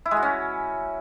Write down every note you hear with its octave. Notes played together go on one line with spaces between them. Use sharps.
E4
G#3
F#4
C#4